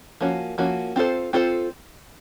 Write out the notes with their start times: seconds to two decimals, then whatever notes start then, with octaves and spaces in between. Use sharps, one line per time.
0.21 F3 A#3 C#4 F#4
0.58 F3 A#3 C#4 F#4
0.96 C4 F4 A4 C5
1.33 C4 F4 A4 C5